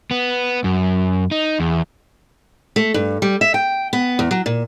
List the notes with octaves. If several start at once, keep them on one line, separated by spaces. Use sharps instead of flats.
B3
F#2
D#4
E2
A3
G2
G3
E5
G5
B3
E2
F#3
A#2